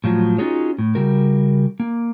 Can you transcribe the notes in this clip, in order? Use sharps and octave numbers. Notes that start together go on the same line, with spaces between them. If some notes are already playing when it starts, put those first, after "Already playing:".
A2 F3 F#3
C#4 D#4 F4 F#4 G#4 C#5
A2
C#3 G3 F#4 A#4
A#3